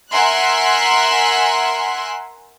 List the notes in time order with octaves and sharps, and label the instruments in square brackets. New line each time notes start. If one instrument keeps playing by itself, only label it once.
[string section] A#4 E5 F#5 G#5 C6 F#6